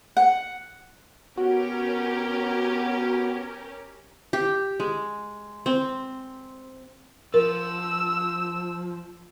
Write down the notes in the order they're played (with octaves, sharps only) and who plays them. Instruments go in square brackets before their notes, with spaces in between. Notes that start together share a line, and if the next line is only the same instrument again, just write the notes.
[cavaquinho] F#5
[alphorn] B3 [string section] C#4 G4 A#4 [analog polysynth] F#4
[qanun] G4
G#3
C4
[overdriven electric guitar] F3 [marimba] A#4 [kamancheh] E6